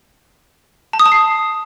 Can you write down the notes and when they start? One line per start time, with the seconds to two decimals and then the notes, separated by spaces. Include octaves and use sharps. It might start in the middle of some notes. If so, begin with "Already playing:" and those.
0.93 A5
0.99 D#6
1.06 A5
1.12 C7